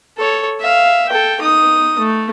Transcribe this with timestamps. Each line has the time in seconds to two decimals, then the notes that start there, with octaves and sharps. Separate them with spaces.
0.18 A4 C#5
0.61 E5 F5
1.09 A4 G5
1.41 D#4 D#6
1.99 A3